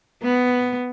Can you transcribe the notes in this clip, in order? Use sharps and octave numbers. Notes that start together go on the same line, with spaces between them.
B3